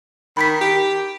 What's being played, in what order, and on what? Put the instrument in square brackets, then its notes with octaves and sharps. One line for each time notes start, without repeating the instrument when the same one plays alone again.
[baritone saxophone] D#3 [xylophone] B5 B6
[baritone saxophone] G4